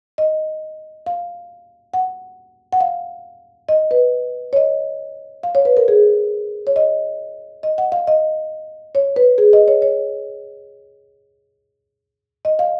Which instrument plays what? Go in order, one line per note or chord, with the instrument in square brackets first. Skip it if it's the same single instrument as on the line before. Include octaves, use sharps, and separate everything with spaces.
[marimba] D#5
F5
F#5
F#5
F5
D#5
B4
C#5
D#5
F5
C#5
B4
A#4
G#4
C#5
D#5
D#5
F#5
F5
D#5
C#5
B4
G#4
D#5
C#5
C#5
D#5
F5